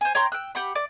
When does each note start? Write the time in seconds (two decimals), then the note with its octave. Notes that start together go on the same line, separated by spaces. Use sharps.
0.01 C5 G#5
0.15 C#5 G5 A#5 C6
0.32 G5 E6 F#6
0.55 G4 F#5 B5
0.75 D5